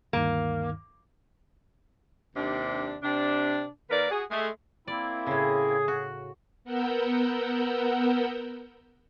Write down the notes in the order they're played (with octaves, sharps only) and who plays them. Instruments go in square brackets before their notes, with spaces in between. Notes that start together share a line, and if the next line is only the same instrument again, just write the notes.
[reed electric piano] D2 G2 D#3 [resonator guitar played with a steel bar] A#3
[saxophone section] D#2 C3 D4
C3 D4
D#3 A#3 A#4 B4 D5
F#4 G#4
G#3 A3
[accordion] A#3 C4 E4 [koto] D5
[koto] A2 C#3 [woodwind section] G#4
[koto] F#4
[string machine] B3 A#4 F#5 E6 G6